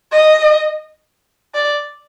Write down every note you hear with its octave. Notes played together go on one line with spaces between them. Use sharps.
D#5
D5